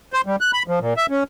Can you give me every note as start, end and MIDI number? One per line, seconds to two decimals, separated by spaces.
0.13 0.21 72
0.26 0.36 55
0.41 0.51 90
0.53 0.63 83
0.68 0.79 53
0.80 0.94 46
0.97 1.06 76
1.10 1.24 61